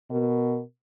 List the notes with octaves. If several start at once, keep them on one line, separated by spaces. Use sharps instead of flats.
B2 A#4